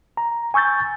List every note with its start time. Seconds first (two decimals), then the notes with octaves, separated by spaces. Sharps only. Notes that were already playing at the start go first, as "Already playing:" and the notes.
0.17 A#5
0.54 G#5 C#6 E6 G6 A6